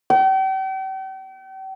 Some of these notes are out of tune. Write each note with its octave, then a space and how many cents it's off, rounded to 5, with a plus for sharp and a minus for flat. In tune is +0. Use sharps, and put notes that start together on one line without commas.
G5 -40